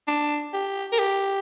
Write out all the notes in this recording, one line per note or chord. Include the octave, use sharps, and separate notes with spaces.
D4
G4
A#4
G4